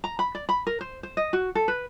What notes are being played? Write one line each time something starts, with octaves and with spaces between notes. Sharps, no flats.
A#5
B5
D5
B5
A#4
C5
C5
D#5
F#4
A4
B4